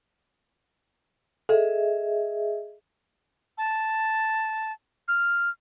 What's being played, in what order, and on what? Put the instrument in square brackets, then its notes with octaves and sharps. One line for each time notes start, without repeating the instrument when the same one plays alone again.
[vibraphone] G#4 D#5 E5 [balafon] A4
[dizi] A5
F6